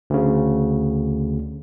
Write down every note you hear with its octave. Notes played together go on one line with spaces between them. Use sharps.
D2 C#3